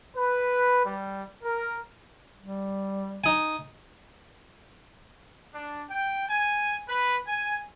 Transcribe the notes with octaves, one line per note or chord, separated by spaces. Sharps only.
B4
G3
A#4
G3
D#4 G#5
D4
G5
G#5
B4
G#5